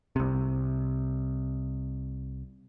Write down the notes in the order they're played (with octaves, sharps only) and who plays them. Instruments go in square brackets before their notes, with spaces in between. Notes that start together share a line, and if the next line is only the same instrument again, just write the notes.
[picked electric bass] C2 C3